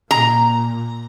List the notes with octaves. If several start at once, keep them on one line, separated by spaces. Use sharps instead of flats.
A#2 A#5